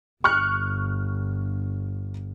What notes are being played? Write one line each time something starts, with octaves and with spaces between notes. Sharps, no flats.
G1 C#6 F6 F#6